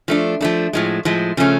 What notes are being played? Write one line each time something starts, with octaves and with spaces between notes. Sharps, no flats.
F3 A3 D4
F3 A3 D4
A2 F3 G#3
A2 F3 G#3
C#3 F3 A3 C#4